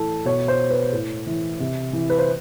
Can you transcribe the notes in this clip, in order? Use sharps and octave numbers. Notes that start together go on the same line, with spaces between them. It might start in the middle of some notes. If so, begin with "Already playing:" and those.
Already playing: A2 E3 A4
B2 C#5
C5
B4
A2
E3
C3
E3
B4
C5